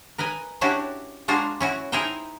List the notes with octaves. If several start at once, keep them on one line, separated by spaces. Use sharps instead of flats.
A#4 B4 D#5 G#5
C#4 D4 E4 F#4 G4
G#3 A#3 D4 F4 F#4
C#4 E4 F#4
D#4 E4 G#4 A#4 C5 G5